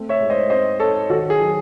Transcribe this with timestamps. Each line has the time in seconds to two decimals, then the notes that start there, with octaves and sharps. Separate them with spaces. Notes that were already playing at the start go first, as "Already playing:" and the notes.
Already playing: A3 C4
0.09 C#5 E5
0.20 G#2
0.30 C5 D#5
0.50 C4 C5 D#5
0.79 D#4 A4 C#5
1.10 D#3 F#4 A4
1.30 G#4
1.40 F#3